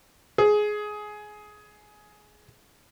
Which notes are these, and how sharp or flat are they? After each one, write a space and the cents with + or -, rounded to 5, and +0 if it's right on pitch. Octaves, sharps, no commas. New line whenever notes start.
G#4 +15